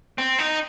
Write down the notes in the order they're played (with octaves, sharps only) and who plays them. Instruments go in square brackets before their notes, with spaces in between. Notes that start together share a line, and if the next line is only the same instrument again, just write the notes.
[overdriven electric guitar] C4
D#4